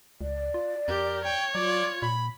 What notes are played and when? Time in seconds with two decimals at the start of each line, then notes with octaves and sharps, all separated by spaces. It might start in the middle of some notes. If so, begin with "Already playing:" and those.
0.21 C#2 D5
0.54 F4
0.88 F2 G4 A#4
1.25 C#5 G5
1.55 F#3 F4 D5
2.02 A#2 B5